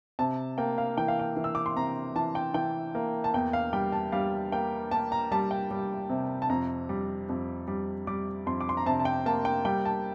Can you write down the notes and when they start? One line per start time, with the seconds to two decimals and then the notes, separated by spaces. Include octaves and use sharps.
0.19 C3 A5
0.58 A#3 G5
0.78 F5
0.97 E3 G5
1.08 F5
1.19 G5
1.37 E3
1.44 E6
1.55 D6
1.66 C6
1.76 C3 A#5
2.16 E3 A5
2.35 G5
2.54 E3 G5
2.95 A#3
3.24 A5
3.34 E2 G5
3.53 F5
3.73 G3 G5
3.92 A5
4.12 G3 F5
4.52 A#3 G5
4.91 A#3 A5
5.12 A#5
5.31 G3 A5
5.51 G5
5.71 G3
6.09 C3
6.42 A5
6.50 F2 A#5
6.89 G3
7.29 F2
7.68 G3
8.07 G3 D6
8.46 F2 C6
8.61 D6
8.69 C6
8.77 A#5
8.86 C3 A5
8.99 A5
9.05 G5
9.26 A#3 A5
9.45 G5
9.65 G3 G5
9.85 A5